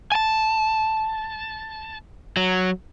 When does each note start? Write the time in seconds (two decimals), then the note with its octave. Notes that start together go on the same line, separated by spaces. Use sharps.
0.12 G#5 A5
2.37 F#3